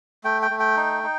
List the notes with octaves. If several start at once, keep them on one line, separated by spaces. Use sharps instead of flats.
A3 G5
G5
A3
G5
D#4
D#4